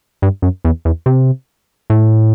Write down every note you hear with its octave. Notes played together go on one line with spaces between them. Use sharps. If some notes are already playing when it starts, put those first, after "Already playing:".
G2
F#2
E2
E2
C3
A2